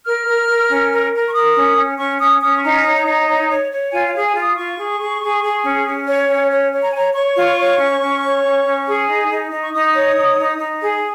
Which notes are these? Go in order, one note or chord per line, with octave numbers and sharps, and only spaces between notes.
A#4 F6
A#4
A#4
C#4
A#4
A#4
C#6
A#4 D#6
C#4
C#4
C#4 C#6
C#4 D#6
C#4 D#6
C#6
D#4 A#5
C#5
D#4
C#5
C#5
C#5
F4 G#5
F5
G#4
G#5
F4
D#6
F4 C#6
G#4
G#4
G#4
G#4
C#4
C#4
C#5
C#4
C#5
C#5
A#5
G#5
C#5 A#5
C#5 C#6
F4
C#5
C#4
C#4
C#5
C#4
C#4
G#4
D#4
D#4
D#4
C#6
D#4 D#6
C#5
D#4
D#4
D#4
G#4